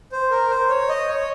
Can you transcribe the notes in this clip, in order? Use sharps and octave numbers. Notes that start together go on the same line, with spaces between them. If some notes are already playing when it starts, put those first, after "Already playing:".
C5
A#4
C5
C#5
D#5
C#5